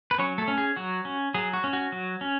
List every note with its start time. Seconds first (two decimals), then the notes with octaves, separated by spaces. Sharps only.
0.11 B4
0.18 F#3 C#4 C#5
0.38 A3 A4
0.48 C#4
0.58 G#4
0.76 F#3 F#4
1.05 C#4
1.34 F#3 G#4
1.53 F#4
1.64 C#4
1.73 F#4
1.92 F#3
2.21 C#4